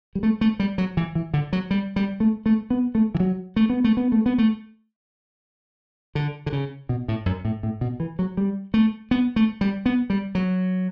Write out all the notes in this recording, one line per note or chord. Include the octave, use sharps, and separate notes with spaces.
G3
A3
A3
G3
F#3
E3
E3
D3
F#3
G3
G3
A3
A3
B3
A3
E3
F#3
A3
B3
A3
B3
A3
B3
A3
D3
D3
C#3
B2
A2
F#2
A2
A2
B2
E3
F#3
G3
A3
B3
A3
G3
B3
G3
F#3